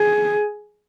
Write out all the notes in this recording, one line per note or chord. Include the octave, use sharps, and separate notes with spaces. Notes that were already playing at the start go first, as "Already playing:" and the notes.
Already playing: G#4